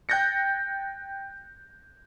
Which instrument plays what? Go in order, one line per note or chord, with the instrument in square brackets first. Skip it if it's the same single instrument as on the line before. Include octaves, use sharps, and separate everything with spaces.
[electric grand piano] G5 F#6 G6 A6 A#6 C#7